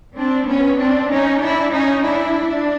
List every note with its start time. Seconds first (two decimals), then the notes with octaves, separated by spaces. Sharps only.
0.16 C4 D4
0.47 B3 C#4
0.78 C4 D4
1.09 C#4 D#4
1.40 D4 E4
1.71 C#4 D#4
2.02 D4 E4
2.48 D4